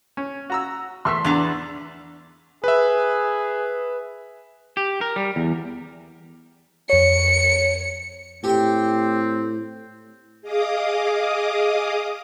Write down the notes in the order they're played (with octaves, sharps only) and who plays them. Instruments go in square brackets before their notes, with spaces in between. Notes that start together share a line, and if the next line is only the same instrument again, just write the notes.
[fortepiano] C#4
F#4 A#5 E6
[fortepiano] E2 A3 C#6 [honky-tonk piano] C6 E6 B6
[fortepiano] E2 [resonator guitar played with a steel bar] B3 D4 A#5
[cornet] G#4 [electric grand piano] B4 E5
[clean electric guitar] G4
A#4
G3
E2
[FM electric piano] F2 C#5 [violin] C#7
[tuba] A2 [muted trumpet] C4 [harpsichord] G4 G5
[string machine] G#4 D#5 F5 D6 D#6